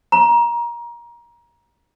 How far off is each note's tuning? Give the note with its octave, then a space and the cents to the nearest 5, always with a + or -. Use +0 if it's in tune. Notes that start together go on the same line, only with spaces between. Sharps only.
A#5 +25